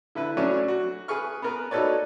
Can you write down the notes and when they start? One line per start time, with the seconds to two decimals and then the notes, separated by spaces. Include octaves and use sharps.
0.15 D3 E4 B4
0.37 F#3 A3 C#4 D4 C#5 D5
0.68 F#4
1.08 G#4 B4 C#6 F6
1.42 B3 A#4 B4
1.71 D#4 F#4 A4 B4 C#5 D5